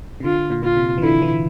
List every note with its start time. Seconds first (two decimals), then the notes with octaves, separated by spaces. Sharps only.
0.20 C3
0.24 D3 F4
0.50 A#2
0.64 F4
0.77 C3
0.98 E3
1.03 D3 E4
1.22 E3